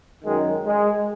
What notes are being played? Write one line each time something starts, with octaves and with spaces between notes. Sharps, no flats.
F#2 D#3 G#3
G#3